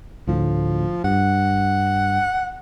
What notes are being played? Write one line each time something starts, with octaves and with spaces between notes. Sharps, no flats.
D2 A2 F3
G2 F#5